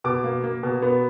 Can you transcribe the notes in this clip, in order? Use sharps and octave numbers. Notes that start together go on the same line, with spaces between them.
B2 D6
A#3
A#3
B2
B3